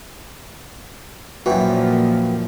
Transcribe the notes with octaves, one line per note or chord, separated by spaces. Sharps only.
F#2 A#2 E3 F3 F#4 B4 G5